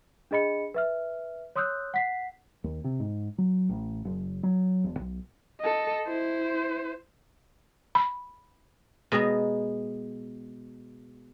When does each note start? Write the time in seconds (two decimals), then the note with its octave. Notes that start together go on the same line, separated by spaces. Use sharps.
0.31 D4 G#4 D#5 B5 C#7
0.74 B4 E5 F6
1.56 C#5 C6 D#6 E6 F#6 G6
1.94 F#5 B6 C7
2.64 D#2
2.84 C3
3.00 G#2
3.38 F#3
3.69 A1
4.05 F#1
4.43 F#3
4.84 E1
4.99 B1
5.60 A4 D#5
6.07 E4 C5
7.95 B5
9.12 B2 G#3 D#5 G#5 A#5